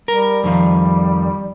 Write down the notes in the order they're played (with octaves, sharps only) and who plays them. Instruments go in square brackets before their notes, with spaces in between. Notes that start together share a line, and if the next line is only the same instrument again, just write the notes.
[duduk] G3 [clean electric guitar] A#4
[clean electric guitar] F2 D#3 F3